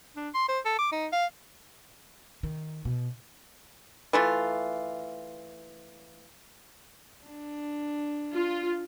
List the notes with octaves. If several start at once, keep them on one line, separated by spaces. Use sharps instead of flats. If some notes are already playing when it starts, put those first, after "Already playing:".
D4
C6
C5
A4
D6
D#4
F5
D#3
B2
E3 A3 F4
D4
F4